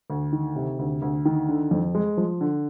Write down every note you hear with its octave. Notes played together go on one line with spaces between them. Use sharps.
D2
D#3
C3
D2
D2
D#3
D3
F2
G#3
F3
D3